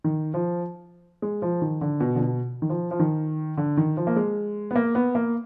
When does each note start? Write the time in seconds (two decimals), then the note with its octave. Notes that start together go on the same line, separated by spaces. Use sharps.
0.04 D#3
0.34 F3
1.22 G#3
1.42 F3
1.62 D#3
1.81 D3
2.00 B2
2.15 D3
2.20 B2
2.62 D#3
2.69 F3
2.91 F3
2.99 D#3
3.57 D3
3.77 D#3
3.97 F3
4.07 A#3
4.16 G#3
4.71 B3
4.75 A#3
4.95 B3
5.15 A#3